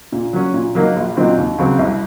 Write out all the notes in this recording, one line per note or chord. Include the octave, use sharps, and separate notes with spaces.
A#2
F#3 C#4
A#2
F#3 A#3 D#4
A#1
A#2 F#3 C4 D#4
D#2
C#3 F#3 C4
C2